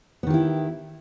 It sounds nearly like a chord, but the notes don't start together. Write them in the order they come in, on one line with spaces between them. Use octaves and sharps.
B3 D#3 G4 E4